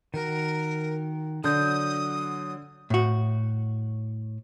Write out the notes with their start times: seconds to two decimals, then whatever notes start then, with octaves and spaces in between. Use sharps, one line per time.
0.14 D#3 F#4 A#4
1.44 D3 F#3 D#6 G6
2.90 A2 F#4